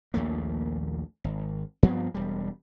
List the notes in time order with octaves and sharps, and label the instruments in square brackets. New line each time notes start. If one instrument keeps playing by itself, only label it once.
[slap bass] A#1 D#2 A3 A#3
G#1
G2 F3 B3 C4
E1 G3